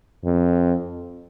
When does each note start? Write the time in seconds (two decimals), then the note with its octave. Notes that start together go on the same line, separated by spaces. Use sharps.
0.25 F2